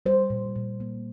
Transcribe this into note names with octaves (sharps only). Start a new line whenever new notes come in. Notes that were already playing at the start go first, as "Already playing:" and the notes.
G3 C5
A#2
A#2
A#3